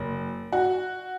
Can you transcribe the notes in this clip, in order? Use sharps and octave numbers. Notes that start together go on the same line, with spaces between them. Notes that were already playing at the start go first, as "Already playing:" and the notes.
Already playing: F#1
F#4